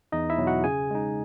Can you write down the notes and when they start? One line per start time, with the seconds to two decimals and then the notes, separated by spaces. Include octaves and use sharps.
0.12 E2 D#4 D#5
0.30 E4 E5
0.38 B2 F#3
0.47 F#4 F#5
0.64 C#3 G#4 G#5
0.91 G#3 D#4